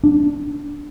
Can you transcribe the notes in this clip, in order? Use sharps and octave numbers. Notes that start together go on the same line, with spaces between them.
D4